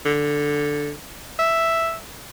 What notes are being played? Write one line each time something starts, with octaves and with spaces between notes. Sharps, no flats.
D3
E5